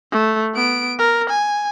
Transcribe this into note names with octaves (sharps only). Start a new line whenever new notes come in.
A3
B3 D7
A#4
G#5